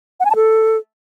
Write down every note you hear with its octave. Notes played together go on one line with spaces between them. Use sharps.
F#5
G#5
A5
A4